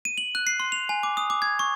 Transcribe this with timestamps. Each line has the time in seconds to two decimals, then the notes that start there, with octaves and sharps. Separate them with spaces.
0.05 D#7
0.18 F#7
0.35 F#6
0.47 C7
0.60 C6
0.72 F7
0.89 G#5
1.03 D6
1.17 D#6
1.30 D6
1.42 G#6
1.59 C#6